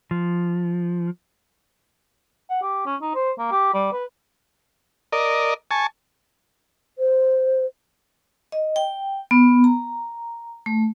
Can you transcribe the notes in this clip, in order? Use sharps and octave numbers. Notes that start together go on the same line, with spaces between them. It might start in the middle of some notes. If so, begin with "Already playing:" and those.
F3
F#5
G4
C#4
D#4
C5
A#3
G4
G3
B4
A#4 D5 D#5
G#5 A5 C#6
C5
D#5
G5
B3
A#5
A3